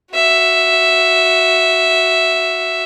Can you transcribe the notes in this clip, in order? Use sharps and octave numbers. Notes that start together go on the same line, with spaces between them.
F#4 E5